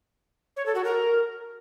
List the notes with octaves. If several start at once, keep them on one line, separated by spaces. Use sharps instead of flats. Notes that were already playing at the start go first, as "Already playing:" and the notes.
C#5
A4
F#4
A#4